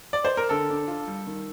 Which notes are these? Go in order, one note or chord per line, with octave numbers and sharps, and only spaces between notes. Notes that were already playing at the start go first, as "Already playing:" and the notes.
D5
C5
A#4
D3 A4
D4
F4
G3
D#3